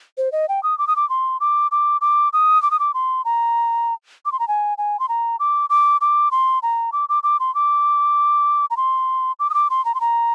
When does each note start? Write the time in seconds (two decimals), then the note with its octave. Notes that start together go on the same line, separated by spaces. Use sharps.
0.18 C5
0.32 D#5
0.49 G5
0.63 D#6
0.78 D6
0.88 D#6
0.96 D6
1.10 C6
1.40 D6
1.71 D6
2.01 D6
2.33 D#6
2.63 D6
2.71 D#6
2.80 D6
2.94 C6
3.25 A#5
4.26 D6
4.32 C6
4.40 A#5
4.48 G#5
4.78 G#5
5.00 C6
5.09 A#5
5.40 D6
5.70 D6
6.01 D6
6.31 C6
6.63 A#5
6.93 D6
7.09 D6
7.23 D6
7.40 C6
7.55 D6
8.70 A#5
8.77 C6
9.40 D6
9.50 D#6
9.54 D6
9.70 C6
9.85 A#5
9.95 C6
10.01 A#5